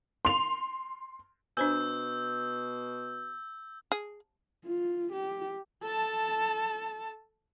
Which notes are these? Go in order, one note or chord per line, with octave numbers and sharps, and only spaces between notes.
C6 F7
B2 D4 C5 G#5 E6 G6
G#4
F4
G4
A4 A5